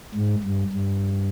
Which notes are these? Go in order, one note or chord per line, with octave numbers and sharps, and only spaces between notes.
G#2
G2
G2